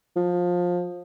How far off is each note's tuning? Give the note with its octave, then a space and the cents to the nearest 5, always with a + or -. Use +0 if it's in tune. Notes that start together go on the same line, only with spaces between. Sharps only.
F3 +20